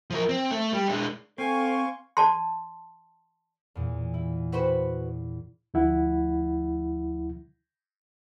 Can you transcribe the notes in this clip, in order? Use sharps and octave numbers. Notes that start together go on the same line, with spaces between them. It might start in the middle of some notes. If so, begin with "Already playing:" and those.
F3 A#4
C4
A3
G3
G#3 D4
C4 A4 F5 G#5 C6 C#6
D5 A5 C6
E2 A#2
E4
E4 F#4 B4 C5
D2 F3 E4 F#5